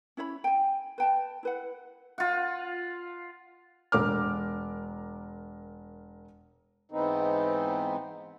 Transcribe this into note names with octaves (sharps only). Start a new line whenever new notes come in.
C#4 E4 C#5 B5
G5 G#5
B4 G5 A5
E4 B4 F#5
F4 F#5
E1 A#4 D6 F6
G#2 E3 B3 C4 D#4